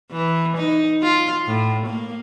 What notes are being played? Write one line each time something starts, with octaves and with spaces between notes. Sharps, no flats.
E3
D#4
F4
A2
A#3